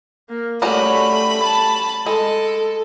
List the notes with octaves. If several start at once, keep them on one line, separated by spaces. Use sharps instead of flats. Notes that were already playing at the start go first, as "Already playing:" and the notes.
A#3
G3 A3 C#4 F#4 B5
A5
G#3 A4